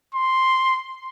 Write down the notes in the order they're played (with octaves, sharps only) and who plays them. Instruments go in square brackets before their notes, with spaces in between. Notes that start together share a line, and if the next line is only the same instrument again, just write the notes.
[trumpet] C6